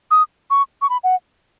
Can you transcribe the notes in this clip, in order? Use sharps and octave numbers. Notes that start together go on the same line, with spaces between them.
D#6
C#6
C#6
B5
F#5